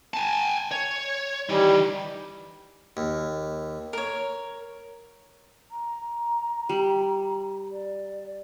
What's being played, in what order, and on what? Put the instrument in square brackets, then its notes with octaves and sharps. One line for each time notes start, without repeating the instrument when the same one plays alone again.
[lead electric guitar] G#5 A5
C#5
[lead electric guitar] D#3 E3 [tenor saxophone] G3
[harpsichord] D#2
[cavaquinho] A#4 C#5
[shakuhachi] A#5
[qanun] G3
[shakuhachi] D5